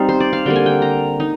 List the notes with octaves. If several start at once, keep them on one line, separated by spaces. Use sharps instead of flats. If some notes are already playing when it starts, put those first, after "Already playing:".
Already playing: G3 C4 D#4 F5
C5
D5
F5
D3 G3 A#3 G5
G#5
G5
A#5
D#4